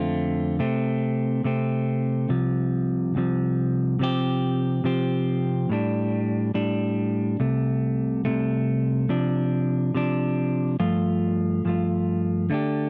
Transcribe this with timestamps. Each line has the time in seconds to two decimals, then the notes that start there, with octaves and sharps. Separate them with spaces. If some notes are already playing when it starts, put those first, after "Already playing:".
Already playing: F2 D3 A3 C4 F4
0.59 C3 A3 C4
1.44 C3 A3 C4
2.29 C2 C3 F3
3.15 C2 C3 F3
3.99 C3 F3 C4 G4
4.84 C3 F3 C4 G4
5.70 A2 G3 D4
6.54 A2 G3 D4
7.40 C2 C3 A3
8.25 C2 C3 A3
9.09 C3 F3 D4
9.95 C3 F3 D4
10.80 G2 F3 A3 F4
11.65 G2 F3 A3 F4
12.50 D3 A3 D4 G4